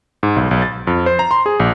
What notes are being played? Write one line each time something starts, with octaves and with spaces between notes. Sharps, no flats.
G#2
B1
B1
A6
F2
C5
A#5
C6
G#4
A#1